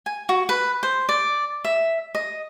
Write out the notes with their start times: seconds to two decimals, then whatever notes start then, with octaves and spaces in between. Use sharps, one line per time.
0.06 G#5
0.29 F#4
0.49 B4
0.83 C5
1.09 D5
1.65 E5
2.15 D#5